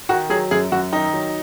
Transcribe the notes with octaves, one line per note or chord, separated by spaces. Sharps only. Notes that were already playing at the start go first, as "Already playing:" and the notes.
D#3 F#4
F#3 G#4
F#2 G#4
F#2 F#4
D#3 D#4
F#3